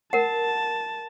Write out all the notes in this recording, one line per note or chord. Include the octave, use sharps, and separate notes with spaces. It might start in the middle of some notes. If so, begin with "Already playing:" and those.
A#4 F#5 A5